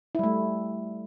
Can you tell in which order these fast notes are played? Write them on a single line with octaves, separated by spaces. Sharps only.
E4 G3 A3